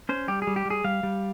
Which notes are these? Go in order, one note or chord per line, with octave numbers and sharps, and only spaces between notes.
C#4 C5
G3 G4
G#4
G3
G4
G3 G#4
G3 F5
G3